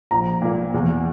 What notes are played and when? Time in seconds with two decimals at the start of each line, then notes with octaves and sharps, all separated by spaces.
0.11 A#1 A#5
0.42 A#2 A#3
0.74 E2